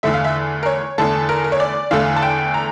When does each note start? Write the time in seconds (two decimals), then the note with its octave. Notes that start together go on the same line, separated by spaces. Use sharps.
0.03 E2 D3 A3 E5
0.14 F5
0.24 E5
0.63 A#4
0.66 C#5
0.98 E2 D3 A3 A4
1.29 A#4
1.44 A#4
1.52 C#5
1.60 D5
1.91 E2 D3 A3 F5
2.16 A5
2.22 G5
2.54 A#5